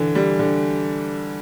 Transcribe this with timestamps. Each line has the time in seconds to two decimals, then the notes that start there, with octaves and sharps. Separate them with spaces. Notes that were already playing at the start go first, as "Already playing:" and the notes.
Already playing: D3 E3
0.15 G3
0.39 D3